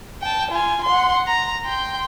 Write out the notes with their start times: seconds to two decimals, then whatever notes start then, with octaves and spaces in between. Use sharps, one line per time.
0.22 G5 A5
0.51 F4 G#5
0.84 F#5 C6
1.27 A#5
1.65 G5 C6